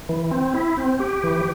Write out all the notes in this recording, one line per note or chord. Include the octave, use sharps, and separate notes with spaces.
E3
C4
E4
C4
G4
E3